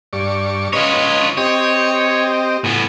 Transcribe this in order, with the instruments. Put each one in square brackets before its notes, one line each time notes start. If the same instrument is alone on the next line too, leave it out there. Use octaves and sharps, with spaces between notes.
[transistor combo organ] G2 D5 C#6
[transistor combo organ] C#4 B4 D#5 [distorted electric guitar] F4 C#5
[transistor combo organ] C4 G4 D#5 [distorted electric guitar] C#5
[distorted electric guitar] A2 B3 [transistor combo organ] G#5